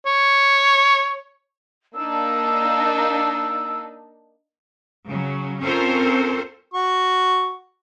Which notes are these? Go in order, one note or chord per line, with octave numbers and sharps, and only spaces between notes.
C#5
A#3 D4 D#4 E6
C#3 F#3
C4 C#4 F4 A4 A#4 C5
F#4 C#6